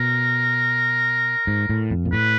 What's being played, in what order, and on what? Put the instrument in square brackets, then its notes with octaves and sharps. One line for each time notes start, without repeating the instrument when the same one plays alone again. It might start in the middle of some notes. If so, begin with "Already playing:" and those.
Already playing: [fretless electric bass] B2 [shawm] A#4
[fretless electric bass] G#2
A2
F2
A#2
[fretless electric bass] A2 [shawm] B4